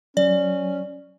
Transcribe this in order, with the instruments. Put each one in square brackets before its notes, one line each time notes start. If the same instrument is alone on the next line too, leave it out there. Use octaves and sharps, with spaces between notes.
[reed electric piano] F#3 [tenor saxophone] C#4 [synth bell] D5